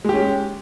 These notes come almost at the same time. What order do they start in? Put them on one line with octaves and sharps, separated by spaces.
G#3 G4 C#4